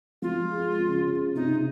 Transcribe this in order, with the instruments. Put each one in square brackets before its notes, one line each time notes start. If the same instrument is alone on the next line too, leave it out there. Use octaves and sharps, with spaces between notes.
[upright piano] F3 [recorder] F4
[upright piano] G#3
C#3
C#3
[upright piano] C3 [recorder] D#4